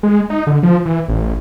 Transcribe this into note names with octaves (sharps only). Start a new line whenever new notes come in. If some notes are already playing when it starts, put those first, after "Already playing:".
G#3
D#4
D3
F3
E3
A1